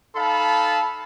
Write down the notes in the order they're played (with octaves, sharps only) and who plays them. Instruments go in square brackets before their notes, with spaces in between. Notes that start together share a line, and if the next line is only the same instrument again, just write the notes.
[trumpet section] D#4 A4 F5 A5 B5